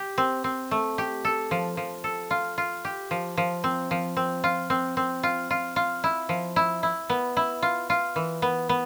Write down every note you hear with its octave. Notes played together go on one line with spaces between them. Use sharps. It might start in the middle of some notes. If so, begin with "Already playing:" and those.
Already playing: G4
C4
C4
A3
G4
A4
F3
F3
A4
F4
F4
G4
F3
F3
C4
F3
C4
F4
C4
C4
F4
F4
F4
E4
F3
E4
E4
B3
E4
F4
F4
E3
B3
B3